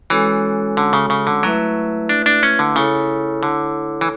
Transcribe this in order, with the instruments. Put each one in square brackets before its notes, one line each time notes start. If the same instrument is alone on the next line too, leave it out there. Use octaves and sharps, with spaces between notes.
[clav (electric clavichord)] E3 [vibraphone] G#3 C#4 F#4 A4 C#5
[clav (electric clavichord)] D3
C#3
C#3
D3
[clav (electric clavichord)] F#3 [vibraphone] A3 E4 B4 E5
[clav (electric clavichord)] D4
D4
C#4
D3
[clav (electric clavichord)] C#3 [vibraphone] E4 A4 C#5
[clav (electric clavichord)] D3
E3